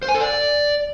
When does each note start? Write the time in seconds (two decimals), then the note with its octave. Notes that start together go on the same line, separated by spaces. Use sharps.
0.02 C5
0.08 G#5
0.14 A4
0.20 D5